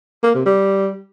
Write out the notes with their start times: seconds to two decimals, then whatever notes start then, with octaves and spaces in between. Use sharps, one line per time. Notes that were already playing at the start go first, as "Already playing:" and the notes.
0.23 A#3
0.34 C3
0.46 G3